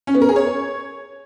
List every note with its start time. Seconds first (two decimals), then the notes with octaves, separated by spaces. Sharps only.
0.07 C#4
0.14 B3
0.22 A#4
0.29 G#4
0.36 C#5